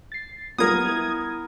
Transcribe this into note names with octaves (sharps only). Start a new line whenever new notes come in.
A6 C7
F#3 G3 B3 F4 A#4 D#6 G#6
E4